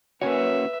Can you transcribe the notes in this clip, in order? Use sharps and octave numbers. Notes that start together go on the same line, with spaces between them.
A#3 C#4 F#4 B4 C#5 E5 G#5